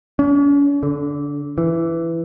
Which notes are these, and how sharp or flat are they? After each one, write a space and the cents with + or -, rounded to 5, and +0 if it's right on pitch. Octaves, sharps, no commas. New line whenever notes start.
C#4 +45
D3 -20
E3 +10